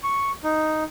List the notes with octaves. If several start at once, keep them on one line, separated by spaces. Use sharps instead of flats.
C#6
D#4